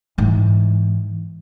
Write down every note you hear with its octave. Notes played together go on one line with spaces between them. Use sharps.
G#2 E3